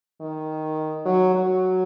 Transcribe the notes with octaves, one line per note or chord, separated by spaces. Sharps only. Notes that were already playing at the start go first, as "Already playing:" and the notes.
D#3
F#3
F#3